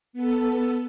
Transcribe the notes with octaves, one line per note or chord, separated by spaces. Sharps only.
B3 A4